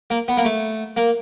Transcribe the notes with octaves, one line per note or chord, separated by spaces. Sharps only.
A#3
B3
A#3
A3
A#3